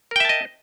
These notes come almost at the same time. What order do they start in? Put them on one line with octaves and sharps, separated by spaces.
A#4 G5 E5 A5 D#5